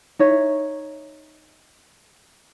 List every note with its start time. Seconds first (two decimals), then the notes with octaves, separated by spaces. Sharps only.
0.19 D#4 C#5 E5